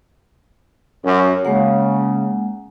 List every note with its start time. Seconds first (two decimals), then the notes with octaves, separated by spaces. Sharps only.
1.04 F#2
1.45 C#3 G#3 A#3 F#5